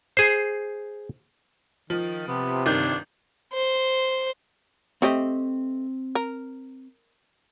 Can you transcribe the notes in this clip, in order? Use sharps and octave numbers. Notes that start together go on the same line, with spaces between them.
G#4 C5
D#3 F3
C3 B3
G1 D#3 D4 G6
C5
A3 C4 G4 D#5
A#4